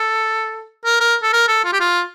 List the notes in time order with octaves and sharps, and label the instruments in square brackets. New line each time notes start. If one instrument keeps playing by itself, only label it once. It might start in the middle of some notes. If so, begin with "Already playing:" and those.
Already playing: [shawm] A4
A#4
A#4
A4
A#4
A4
F4
G4
F4